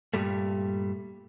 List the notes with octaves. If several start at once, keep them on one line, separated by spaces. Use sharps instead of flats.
G2 A#2 G3 A3